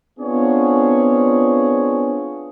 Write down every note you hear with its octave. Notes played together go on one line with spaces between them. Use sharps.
B3 C4 D4 F4 G#4 C#5